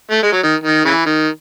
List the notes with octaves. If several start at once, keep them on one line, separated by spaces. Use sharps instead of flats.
A3
G#3
F#3
D#3
D#3
C#3 E3
D#3